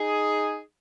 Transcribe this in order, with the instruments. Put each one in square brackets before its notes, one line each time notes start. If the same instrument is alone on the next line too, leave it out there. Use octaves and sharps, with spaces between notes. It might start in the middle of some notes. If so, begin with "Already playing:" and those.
Already playing: [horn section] D#4 G#4